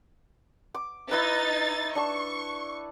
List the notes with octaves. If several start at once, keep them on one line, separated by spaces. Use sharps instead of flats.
D6
D#4 E4 B4 A6
D4 A5 C#6